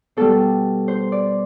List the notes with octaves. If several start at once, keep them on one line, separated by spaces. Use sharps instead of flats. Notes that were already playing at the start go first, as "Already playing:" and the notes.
B2 G3 A4
C5
D5